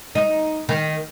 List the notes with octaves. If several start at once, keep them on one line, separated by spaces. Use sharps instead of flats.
D#4
D#3